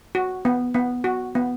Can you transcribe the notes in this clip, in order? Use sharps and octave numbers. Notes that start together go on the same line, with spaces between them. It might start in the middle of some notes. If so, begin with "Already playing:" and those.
F#4
B3
B3
F#4
B3